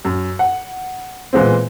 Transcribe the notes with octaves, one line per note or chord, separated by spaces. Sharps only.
F#2
F#5
A#2 E3 G#3 B3 C4